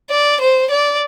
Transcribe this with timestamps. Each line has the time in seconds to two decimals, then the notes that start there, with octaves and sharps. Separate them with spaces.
0.10 D5
0.41 C5
0.71 D5